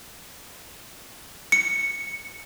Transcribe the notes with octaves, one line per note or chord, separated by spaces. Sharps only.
C#7